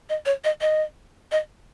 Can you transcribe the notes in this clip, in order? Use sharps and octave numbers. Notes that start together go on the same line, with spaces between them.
D#5
C#5
D#5
D#5
D#5